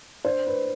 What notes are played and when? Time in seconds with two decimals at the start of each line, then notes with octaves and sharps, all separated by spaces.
0.25 D4 C5
0.47 B4